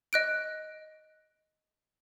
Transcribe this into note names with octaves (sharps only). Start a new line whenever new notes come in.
D#5 F#6 D7